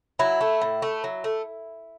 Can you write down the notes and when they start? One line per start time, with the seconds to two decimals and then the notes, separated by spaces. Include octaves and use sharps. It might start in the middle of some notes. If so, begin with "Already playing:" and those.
0.19 F#3 E4
0.41 A3
0.61 A2
0.82 A3
1.04 F#3
1.24 A3